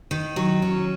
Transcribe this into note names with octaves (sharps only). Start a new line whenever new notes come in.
D#3
F#3
C#4